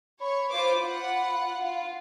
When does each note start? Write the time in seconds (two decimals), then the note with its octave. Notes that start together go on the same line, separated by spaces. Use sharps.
0.21 C#5 B5
0.51 F4 C5 D6
0.81 F4 F#5
1.60 F4